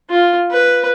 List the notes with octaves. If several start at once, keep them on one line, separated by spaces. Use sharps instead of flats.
F4
B4